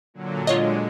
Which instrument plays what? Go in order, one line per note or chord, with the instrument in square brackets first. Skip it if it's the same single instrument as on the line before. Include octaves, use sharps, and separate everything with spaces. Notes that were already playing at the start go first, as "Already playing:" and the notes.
[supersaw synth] A#2 D3 F#3
[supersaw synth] D3 G#3 [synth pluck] F4 C#5 D#5